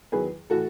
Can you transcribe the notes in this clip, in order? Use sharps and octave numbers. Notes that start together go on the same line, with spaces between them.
E2 D#3 F#3 G#4 B4
A2 E3 F#4 A4